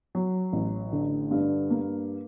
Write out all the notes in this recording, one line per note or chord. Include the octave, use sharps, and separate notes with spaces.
F#3
A1
D3
G2
A#3